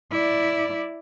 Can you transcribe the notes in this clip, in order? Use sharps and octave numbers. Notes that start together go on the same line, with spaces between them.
E4 D5